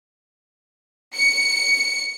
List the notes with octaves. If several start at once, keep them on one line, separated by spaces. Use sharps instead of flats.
C#7